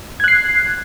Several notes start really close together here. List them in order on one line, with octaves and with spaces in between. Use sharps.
G#6 F#6 C7